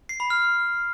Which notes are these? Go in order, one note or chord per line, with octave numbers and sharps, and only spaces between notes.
C7
B5
F6